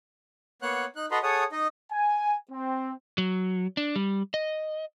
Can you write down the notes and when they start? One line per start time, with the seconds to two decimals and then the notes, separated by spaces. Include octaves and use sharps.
0.62 A#3 B3 C#5 F#5 F#6
0.96 D#4 F#6
1.11 F#4 A4 B4 D#5 A#5 C6
1.23 G#4 A4 C#5 F#5 D#6
1.52 D#4 D#5
1.92 G#5
2.51 C4
3.18 F#3
3.77 D4
3.96 G3
4.34 D#5